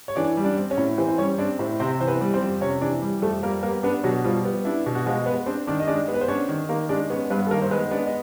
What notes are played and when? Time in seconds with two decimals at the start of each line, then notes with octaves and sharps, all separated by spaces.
0.08 C#5
0.16 E3 D4 D5
0.37 G3
0.44 D4 D5
0.58 C4
0.71 C#4 C#5
0.78 A2
0.98 E3 C4 C5
1.09 C5
1.18 G3 C#4 C#5
1.38 C4 D4 D5
1.59 A2 C4 C5
1.80 C3 C4 C5
2.00 E3 C5
2.07 B3 B4
2.21 G3
2.34 C4 C5
2.41 F2
2.61 C3 C#4 C#5
2.81 E3 D4 D5
3.02 G3
3.22 F2 A3 A4
3.43 G3 A#3 A#4
3.63 A#3 B3 A#4
3.83 B3 D4 B4
4.04 B2 F#3 F#4
4.24 F3 G3 F4
4.45 B3
4.65 D4 E4
4.86 B2
4.95 F#4
5.06 F3 G#3 F4
5.26 B3 B4
5.46 C4 D4 C5
5.67 D#3 D4 D5
5.80 D#5
5.87 G#3 D4 D5
6.08 B3
6.14 B4
6.21 C5
6.28 C#4 D4 C#5
6.49 D#3
6.69 D#3 A#3 A#4
6.89 G#3 D4 D5
7.10 B3 C#4 C#5
7.30 G2 B3 B4
7.47 A4
7.51 D#3 A#3 A#4
7.62 C5
7.71 G#3 B3 B4
7.91 B3 D4 D5
8.07 D#5